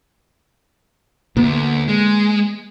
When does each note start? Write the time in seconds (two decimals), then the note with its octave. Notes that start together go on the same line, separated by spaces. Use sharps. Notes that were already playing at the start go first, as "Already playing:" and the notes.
1.37 D2 A#3 B3
1.88 G#3